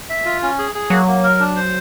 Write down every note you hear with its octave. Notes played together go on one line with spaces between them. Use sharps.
E5
F4
C#4
G#4
G#4
F#3 A#3
A#3
A#4
D4
C5